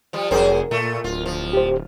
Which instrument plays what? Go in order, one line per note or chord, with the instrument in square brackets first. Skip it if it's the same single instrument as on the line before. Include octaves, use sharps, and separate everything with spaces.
[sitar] F3 G3
[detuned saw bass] F1 [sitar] F#3 G#4 C5 [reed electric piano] A#4
[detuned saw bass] A#2 [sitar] A3
[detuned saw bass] D1 [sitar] F4
[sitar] F3
[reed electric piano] G4 C5